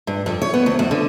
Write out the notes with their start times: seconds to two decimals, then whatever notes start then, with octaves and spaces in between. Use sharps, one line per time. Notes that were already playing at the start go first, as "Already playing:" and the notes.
0.07 G2
0.26 F2
0.42 C#5
0.54 B3
0.66 D2
0.79 F2
0.91 D3